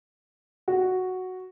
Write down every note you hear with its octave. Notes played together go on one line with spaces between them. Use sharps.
F#4